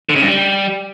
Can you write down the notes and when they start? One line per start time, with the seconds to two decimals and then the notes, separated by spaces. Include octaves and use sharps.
0.09 D3
0.15 C#3
0.22 G2
0.28 G3